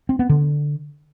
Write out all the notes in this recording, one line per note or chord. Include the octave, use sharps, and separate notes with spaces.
C4
B3
D3